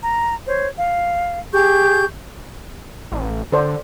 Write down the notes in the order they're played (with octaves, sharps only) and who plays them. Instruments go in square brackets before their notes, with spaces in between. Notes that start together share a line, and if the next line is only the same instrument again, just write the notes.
[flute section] A#5
C5 C#5
F5
G4 G#4 C#6 G6
[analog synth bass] A1
[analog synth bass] D3 [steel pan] A4 C5 D5